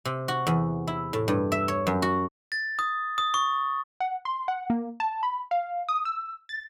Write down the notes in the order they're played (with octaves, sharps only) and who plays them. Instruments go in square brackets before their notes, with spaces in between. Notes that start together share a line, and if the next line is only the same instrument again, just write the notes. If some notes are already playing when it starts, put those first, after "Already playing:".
[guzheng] C3
F#4
E2
E4
A2
G2
E5
C#5
F#2
F#4
[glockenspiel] A6
D#6
D#6
C#6
[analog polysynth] F#5
C6
F#5
A#3
A5
B5
F5
D#6
E6
A6